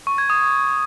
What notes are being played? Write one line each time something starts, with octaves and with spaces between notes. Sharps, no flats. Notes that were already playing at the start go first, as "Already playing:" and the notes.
C#6
G#6
D#6
D#6